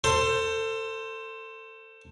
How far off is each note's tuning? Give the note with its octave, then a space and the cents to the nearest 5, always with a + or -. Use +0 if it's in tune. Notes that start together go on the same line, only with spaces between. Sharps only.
A4 +25 C5 +0